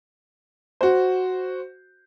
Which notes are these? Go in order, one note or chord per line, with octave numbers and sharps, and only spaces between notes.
F#4 C5